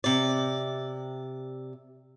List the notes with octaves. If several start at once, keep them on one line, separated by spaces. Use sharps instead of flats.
C3 D5